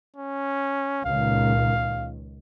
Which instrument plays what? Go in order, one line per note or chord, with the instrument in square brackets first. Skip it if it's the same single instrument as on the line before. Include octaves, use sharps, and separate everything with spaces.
[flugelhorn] C#4
[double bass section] C#2 A#2 D#3 [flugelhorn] F5